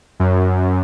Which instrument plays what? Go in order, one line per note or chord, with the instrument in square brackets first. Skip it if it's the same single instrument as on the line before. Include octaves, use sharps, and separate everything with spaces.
[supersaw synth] F#2